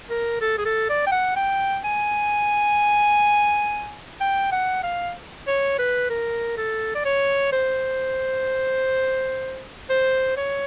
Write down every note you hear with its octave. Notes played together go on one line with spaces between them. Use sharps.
A#4
A4
G#4
A4
D5
G5
F#5
G5
G#5
G5
F#5
F5
C#5
B4
A#4
A4
D5
C#5
C5
C5
C#5